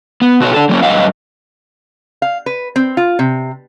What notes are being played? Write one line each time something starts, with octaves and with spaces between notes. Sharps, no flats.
B3
B2 F#4 B4 C#5
D4 A4
F#3 A#3 C#4
G2 F#3 D#5 F5
F5
B4
C4
F4
C3